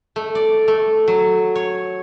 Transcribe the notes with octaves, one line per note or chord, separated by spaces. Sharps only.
A3
D5
A3
F#3
C#5